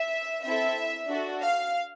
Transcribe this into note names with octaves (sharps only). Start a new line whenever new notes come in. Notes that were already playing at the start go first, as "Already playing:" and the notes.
Already playing: E5
C4 E4 A4 E5
D4 F#4 A4
F5